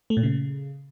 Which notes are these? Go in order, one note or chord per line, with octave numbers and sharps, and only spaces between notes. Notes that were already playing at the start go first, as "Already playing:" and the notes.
A3
A#2
C#3